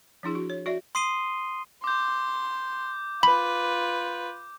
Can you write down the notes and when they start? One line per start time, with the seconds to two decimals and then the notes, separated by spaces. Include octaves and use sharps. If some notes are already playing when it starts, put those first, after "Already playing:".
0.23 F3 D4 E4 G#4
0.35 F#4
0.50 C#5
0.66 F#4 D5 E5
0.95 C6 D#6 C7 D#7 G7
1.84 C6 D6 G6
3.23 F4 B4 B5